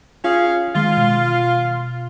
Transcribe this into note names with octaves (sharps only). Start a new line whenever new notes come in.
C#4 F4 G#4 F5
D#3 G#3 F4
B2